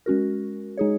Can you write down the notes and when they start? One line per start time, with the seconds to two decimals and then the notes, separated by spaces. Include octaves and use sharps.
0.06 G#3 C#4 F#4 A#4
0.77 G#3 D#4 G#4 C#5